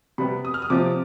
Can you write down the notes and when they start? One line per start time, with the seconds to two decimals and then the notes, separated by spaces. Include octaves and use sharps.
0.18 C3 G3 B3 B5
0.45 D#6
0.54 F6
0.62 D#6
0.70 C3 F3 C4 D6